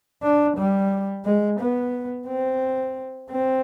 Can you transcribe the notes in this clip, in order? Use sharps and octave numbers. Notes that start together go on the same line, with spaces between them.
D4
G3
G#3
B3
C4
C4